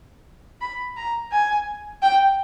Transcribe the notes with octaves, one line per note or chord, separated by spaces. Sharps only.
B5
A#5
G#5
G5